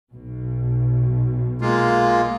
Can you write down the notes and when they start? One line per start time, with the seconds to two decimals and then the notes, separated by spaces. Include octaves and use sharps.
0.12 B1 B2
1.61 G#3 A#3 F4